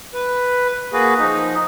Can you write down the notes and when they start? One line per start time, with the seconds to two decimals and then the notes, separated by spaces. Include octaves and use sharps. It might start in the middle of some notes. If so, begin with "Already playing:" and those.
0.14 B4
0.93 A#3 F#4 G#4 B4
1.19 F3 D#4